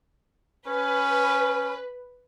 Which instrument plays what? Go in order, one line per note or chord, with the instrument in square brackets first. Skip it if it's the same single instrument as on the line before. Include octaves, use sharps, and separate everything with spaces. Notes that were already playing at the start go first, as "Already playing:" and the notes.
[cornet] C#4 [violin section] B4